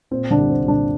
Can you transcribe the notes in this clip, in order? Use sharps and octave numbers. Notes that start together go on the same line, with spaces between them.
A#2 C4
D3 D4
C2
C4
C2
D3 D4